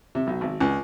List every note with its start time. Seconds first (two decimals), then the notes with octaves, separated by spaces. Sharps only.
0.15 C3
0.27 B1
0.41 G#1
0.60 C#2